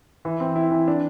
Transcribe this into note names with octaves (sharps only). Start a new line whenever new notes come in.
E3
C4
E4
E3
D4